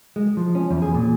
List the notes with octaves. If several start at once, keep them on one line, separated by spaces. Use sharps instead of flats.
G#3
F3
C#4
E2
G#4
A#2